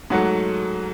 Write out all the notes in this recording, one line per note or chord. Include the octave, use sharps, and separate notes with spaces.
G#2 F#3 A3 F#5